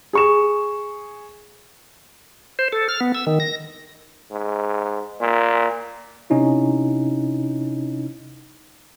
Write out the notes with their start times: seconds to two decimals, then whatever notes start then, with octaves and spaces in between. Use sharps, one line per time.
0.13 G#4 C#6 E7
2.59 C5
2.72 A4
2.89 F6
3.00 B3
3.14 E6
3.27 D#3
3.40 A#6
4.31 G#2
5.20 A#2
6.30 C3 C#4 D#4 E4